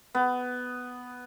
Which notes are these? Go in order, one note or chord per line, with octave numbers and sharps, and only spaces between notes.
B3